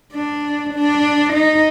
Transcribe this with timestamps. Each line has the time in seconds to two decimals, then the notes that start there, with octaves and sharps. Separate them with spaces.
0.14 D4
0.74 D4
1.33 D#4